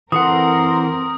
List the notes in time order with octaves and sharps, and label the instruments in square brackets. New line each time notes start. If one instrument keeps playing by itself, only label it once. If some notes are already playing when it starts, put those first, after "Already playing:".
[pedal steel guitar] E3 A4 F#5 [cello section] C4 A#4 [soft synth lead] C6 [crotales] D#6